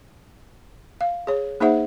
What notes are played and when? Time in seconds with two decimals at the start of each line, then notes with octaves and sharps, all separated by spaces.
1.01 F5
1.27 G#4 C#5
1.60 A#3 D#4 G#4 C5 E5 F#5